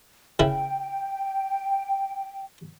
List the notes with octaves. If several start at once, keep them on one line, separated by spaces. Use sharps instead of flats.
C#3 E4 G5